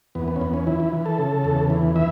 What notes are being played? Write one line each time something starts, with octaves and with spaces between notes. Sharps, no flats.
E2 B3
B3
C#4
E2 B3
C#4
E3 E4
E4
E3
A4
C#3
E2
E3
E3 E5